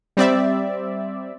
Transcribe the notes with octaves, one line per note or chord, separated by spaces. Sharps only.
G3 C4 D5 E5